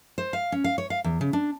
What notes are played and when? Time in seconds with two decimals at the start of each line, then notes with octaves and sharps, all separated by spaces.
0.18 C5
0.33 F5
0.52 C#4
0.64 F5
0.78 C#5
0.90 F5
1.04 E2
1.21 C#3
1.33 D4